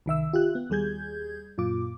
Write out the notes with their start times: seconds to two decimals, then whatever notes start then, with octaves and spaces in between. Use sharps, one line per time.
0.06 C2 D#3 E5 E6
0.33 F4 G4 F#6
0.55 B3
0.70 D#2 G3 G#4 G6 G#6
1.58 F#2 A#2 F4 D6